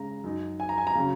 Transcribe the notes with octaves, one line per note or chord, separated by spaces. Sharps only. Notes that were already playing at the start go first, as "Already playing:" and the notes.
Already playing: C#3 G#3 C#4 A#5
F#2 F#3 D#4
G#5
A#5
G#5
A#5
C#3 F#3 C#4